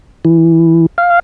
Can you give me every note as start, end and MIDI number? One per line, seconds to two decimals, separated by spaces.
0.25 0.86 52
0.98 1.19 77